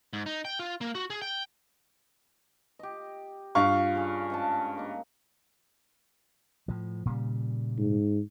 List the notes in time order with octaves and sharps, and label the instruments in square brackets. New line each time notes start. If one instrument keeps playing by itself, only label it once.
[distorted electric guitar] G#2
D#4
G5
F4
A#3
F#4
G#4
G5
[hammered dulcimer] G4 D#5
[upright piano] G2 F5 C#6 [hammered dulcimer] F4
[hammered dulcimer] C#3 G#4
G#2 C#3 A5
A#3 D#4
[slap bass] A2 F3
A#2 C#3 G3
[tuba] G#2